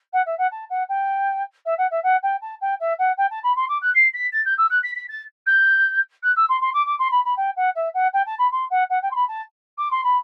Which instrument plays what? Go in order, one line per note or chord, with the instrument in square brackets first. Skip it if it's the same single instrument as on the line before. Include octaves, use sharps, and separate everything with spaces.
[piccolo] F#5
E5
F#5
A5
F#5
G5
E5
F#5
E5
F#5
G5
A5
G5
E5
F#5
G5
A5
B5
C6
D6
F#6
C7
B6
A6
G6
E6
F#6
B6
B6
A6
G6
F#6
E6
C6
C6
D6
D6
C6
B5
B5
G5
F#5
E5
F#5
G5
A5
B5
C6
F#5
F#5
G5
C6
B5
A5
D6
C6
B5